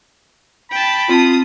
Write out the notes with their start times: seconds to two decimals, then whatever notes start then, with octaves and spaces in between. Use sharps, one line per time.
0.71 G5 A5 B5
1.09 C4 F4 A5 D#6